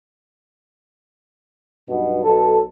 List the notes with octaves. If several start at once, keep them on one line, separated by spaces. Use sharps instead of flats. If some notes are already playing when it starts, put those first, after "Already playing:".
B1 G2 B2
B1 A4